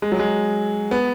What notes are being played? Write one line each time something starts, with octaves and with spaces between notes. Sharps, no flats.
G#3
F#3
G#3
B3